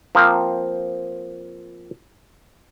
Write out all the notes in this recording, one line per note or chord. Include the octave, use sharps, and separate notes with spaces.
F3 A#3 C4